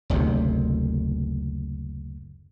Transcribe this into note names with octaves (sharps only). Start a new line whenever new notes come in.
F#1 D2 A2 C3